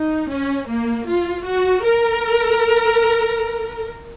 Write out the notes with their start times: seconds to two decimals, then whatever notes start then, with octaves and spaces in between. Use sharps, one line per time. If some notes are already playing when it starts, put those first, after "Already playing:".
Already playing: D#4
0.30 C#4
0.68 A#3
1.06 F4
1.45 F#4
1.83 A#4